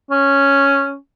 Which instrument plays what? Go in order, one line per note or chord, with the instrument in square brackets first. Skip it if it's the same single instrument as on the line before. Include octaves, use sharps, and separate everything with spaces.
[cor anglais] C#4